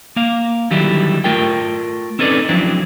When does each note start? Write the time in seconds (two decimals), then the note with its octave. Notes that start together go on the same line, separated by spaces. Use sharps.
0.16 A#3 F5
0.71 D3 D#3 F#3 G3 E4 G4
1.24 A3 F4 A#4 G5
2.19 C4 C#4 D#4 A4 B4 D5
2.49 F3 F#3 C4 D4 E4